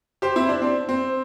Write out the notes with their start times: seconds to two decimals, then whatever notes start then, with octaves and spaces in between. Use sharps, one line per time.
0.22 G4 C5
0.36 C4 E4
0.49 D4
0.62 C4
0.89 C4